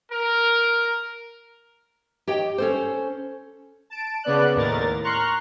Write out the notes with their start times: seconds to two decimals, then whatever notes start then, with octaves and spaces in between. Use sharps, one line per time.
0.11 A#4
2.27 G4 C#5 D#5 G5
2.58 C#4 A4 C5
3.90 A5 D7
4.23 C#3 B3 D5 F#6
4.55 D#2 A2 A#4 A6
5.04 A#5 C6 C#6 F6 F#6